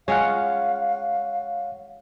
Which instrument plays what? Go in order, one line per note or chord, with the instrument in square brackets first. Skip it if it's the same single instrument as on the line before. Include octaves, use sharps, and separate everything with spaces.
[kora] G#3 C#4 F4 [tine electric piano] C#5 F#5 [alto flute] F5